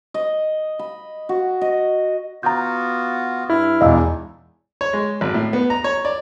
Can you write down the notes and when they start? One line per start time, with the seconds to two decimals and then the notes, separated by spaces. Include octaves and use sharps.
0.14 D#5
0.79 B5
1.29 F#4
1.61 D#5
2.43 B3 F4 F#4 A#5 G6
3.50 G2 E4 F6
3.81 E1 E2 D4 D#4 D#5 F5 E6
4.81 C#5
4.93 G#3
5.21 G#1
5.34 A2
5.53 B3
5.70 A#5
5.84 C#5
6.05 D5